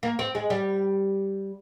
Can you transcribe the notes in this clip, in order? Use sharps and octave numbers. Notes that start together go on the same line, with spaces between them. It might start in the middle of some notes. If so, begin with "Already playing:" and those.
A#3
C4
G#3
G3